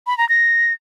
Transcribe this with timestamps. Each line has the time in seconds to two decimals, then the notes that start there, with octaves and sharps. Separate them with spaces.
0.07 B5
0.18 A#5
0.29 A#6